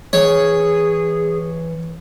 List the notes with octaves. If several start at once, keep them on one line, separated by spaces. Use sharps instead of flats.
E3 G#4 C#5